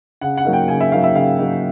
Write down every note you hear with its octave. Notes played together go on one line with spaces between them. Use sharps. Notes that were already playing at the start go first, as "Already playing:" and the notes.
C#3 F#5
F#5
F#3 A#3 D#4
G5
C#3 G#5
E5
F#3 A#3 D#4 F5
E5
C#3 F5
F#3 A#3 D#4